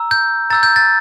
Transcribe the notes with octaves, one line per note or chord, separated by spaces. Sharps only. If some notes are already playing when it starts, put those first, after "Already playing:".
Already playing: A#5 E6
G6
A#5 E6 G6 A6
G6
A6